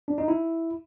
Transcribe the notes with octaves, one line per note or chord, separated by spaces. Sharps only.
D4
D#4
E4